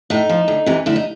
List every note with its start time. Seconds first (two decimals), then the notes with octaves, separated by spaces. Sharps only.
0.10 A2 D#4
0.29 F3
0.48 D2
0.66 C3 E3
0.86 D2 E4
0.96 D#4